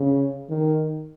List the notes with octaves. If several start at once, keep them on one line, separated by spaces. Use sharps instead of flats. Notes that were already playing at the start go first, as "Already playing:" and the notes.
Already playing: C#3
D#3